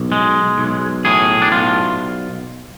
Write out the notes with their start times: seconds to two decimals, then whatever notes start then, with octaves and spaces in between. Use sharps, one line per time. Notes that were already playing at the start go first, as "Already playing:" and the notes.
Already playing: B1
0.12 G#3
0.58 B1
1.05 A2 G#4
1.42 D4
1.52 B1 F4